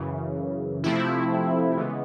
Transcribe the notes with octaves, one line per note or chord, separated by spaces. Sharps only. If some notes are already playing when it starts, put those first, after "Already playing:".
Already playing: F#2 C#3 E3
C3 F3 A3 C4 E4
C#3 E3 G#3 B3